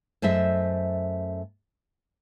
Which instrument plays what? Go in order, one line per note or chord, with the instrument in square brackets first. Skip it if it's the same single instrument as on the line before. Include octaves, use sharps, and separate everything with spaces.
[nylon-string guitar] F#2 A3 C5 D#5 E5